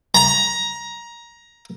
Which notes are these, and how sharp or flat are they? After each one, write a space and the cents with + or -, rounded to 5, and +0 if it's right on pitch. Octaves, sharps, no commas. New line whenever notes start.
A#5 +15